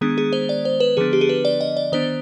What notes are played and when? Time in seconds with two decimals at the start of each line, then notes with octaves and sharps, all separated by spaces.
0.01 D#3 G#3 B3 D4 G#4
0.18 G#4
0.33 C5
0.49 D5
0.65 C5
0.80 B4
0.97 D3 F3 B3 D4 G#4
1.13 G4
1.21 G#4
1.29 B4
1.45 D5
1.61 D#5
1.77 D5
1.92 D#3 B3 D4 C5